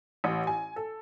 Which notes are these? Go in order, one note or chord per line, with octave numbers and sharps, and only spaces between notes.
A1
G#5
A4